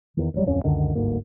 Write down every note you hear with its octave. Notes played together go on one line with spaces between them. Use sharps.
E2 D#3
E1 A1 F#3 G3
D1 F2 C#4
C#2 F#2 D3 D#3
G1 D2 G#2 A#3